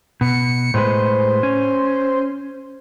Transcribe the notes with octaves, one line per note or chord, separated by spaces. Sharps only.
B2 C#7
A2 G#3 B4 C5
C#4